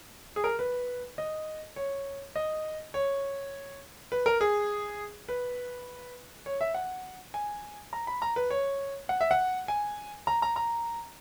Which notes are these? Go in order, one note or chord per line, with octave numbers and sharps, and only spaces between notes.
G#4
A#4
B4
D#5
C#5
D#5
C#5
B4
A#4
G#4
B4
C#5
E5
F#5
G#5
A#5
B5
A#5
B4
C#5
F#5
E5
F#5
G#5
A#5
A#5
A#5